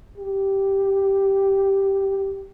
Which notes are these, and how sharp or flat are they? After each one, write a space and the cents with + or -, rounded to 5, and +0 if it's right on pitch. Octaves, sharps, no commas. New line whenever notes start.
G4 -5